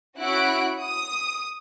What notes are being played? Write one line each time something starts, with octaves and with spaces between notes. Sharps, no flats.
C#4 E4 F#4 F#5 F#6 D7
D#6